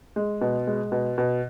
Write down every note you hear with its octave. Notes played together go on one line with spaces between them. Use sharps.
G#3
B2
G#3
B2
B2